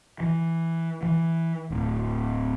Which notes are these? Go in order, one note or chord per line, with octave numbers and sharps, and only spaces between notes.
E3
E3
D1